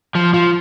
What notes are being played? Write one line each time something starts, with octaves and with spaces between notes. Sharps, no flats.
F3
F3